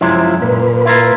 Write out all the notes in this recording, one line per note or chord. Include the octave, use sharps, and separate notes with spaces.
F#2 C3 F3 G#3 E4
A#2 B4
E4 F4 A#4